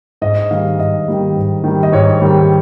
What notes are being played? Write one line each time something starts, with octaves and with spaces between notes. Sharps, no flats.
G#2 D#5
D#3 G3 F5
G#2 D#5
D#3 G3
G#2
D#3 G3
D#5
G#2 C#5
D#3 G3